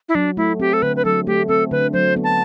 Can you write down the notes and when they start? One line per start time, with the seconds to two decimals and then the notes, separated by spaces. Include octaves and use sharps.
0.09 E4
0.15 F#3 D4
0.37 A3 E4
0.60 C4 G4
0.73 A4
0.82 D3 B4
0.96 B4
1.05 F#3 A4
1.27 A3 G4
1.48 C4 A4
1.71 D3 B4
1.93 F#3 C5
2.16 B3
2.24 A5